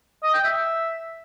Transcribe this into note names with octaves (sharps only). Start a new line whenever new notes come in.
D#5
G5
E5